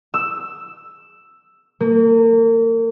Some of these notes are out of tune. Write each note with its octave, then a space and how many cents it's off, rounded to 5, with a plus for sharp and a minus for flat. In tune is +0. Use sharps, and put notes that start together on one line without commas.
E6 +5
A#3 -35